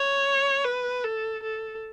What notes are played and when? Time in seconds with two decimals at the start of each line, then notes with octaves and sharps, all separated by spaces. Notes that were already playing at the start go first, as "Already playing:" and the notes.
Already playing: C#5
0.64 B4
1.04 A4
1.43 A4